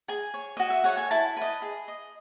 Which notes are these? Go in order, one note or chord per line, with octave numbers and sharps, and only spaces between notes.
G#4 G#5
C#5
F#4 D#5
E5
A4 C#5 F#5
G#5
E4 A5
B4 D#5
G#4
D#5